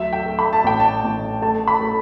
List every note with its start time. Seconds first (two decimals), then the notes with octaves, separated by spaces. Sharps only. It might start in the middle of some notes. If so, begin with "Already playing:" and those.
Already playing: D2 F#3 E5
0.13 G5
0.26 A3
0.39 B5
0.53 A5
0.64 A1 G5
0.80 A5
1.04 A1
1.42 A3 A5
1.68 B5
1.81 A3